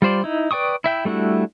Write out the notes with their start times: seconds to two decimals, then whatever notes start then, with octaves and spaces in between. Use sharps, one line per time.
0.02 G3 F4 C5 D5
0.24 D#4 E4
0.51 B4 D5 G5 C#6 D#6
0.84 E4 E5 G5
1.05 G3 A3 D4 E4 F#4